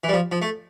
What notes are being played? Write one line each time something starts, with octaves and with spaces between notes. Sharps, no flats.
E3
G3
F3
F3
A3